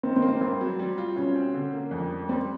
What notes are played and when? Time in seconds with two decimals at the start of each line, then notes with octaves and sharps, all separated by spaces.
0.03 D#3 C4
0.16 C4
0.22 A#3
0.29 C4
0.41 G2 C4
0.61 F#3
0.79 G3
0.98 F4
1.16 B2 C#4
1.36 C4
1.54 D3
1.73 A#3
1.91 F2
2.10 G3
2.29 G3 C4